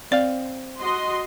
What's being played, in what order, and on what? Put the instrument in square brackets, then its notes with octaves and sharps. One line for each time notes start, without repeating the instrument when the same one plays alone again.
[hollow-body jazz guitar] C4 F5 [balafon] D5
[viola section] F#4 D#5 C6